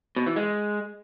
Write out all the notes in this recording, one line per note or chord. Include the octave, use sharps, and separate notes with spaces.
B2
E3
G#3